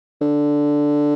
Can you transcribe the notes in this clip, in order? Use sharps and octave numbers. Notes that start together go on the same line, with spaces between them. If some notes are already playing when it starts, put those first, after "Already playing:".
D3